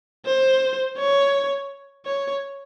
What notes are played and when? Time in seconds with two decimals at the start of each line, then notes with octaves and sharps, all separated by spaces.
0.26 C5
0.98 C#5
2.05 C#5